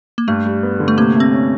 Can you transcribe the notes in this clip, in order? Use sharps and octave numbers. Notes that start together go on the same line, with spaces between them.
A#3
G2 A3
G3
B3
D3
A3
C3 A#3
A3
C4
C#4